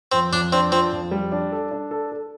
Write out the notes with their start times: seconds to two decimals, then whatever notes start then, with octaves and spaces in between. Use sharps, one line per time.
0.12 F2 C4
0.32 F2 D4
0.52 C4 D4
0.72 F3 C4
0.92 F2
1.11 G3
1.32 D4
1.52 A4
1.71 D4
1.91 A4
2.12 A4